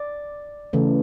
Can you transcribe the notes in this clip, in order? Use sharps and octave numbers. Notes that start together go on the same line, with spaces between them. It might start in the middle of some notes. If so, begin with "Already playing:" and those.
Already playing: D5
C#3 E3 A3